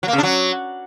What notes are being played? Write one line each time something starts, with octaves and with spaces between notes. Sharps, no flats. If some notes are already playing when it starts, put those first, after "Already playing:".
F#3
A#3
C#3
D4
F#3